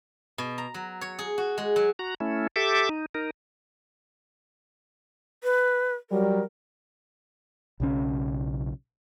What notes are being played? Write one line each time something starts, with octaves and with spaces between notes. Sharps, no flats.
B2
A#5
F#3
C#5
G#4
F#4
G#3
F#3
F#4 A#5
A3 C#4 E4
G4 A4 E5 D6
D#4
D#4 A#4
B4
F#3 G3 A#4
B1 C#3 C#4